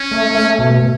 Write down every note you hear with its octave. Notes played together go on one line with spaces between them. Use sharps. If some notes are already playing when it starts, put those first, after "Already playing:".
Already playing: C#4
A3
A3
B2